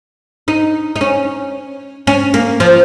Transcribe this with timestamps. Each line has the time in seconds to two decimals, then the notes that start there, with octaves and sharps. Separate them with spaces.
0.48 D#4
0.96 D#4
1.01 C#4
2.07 C#4
2.34 A#3
2.60 F3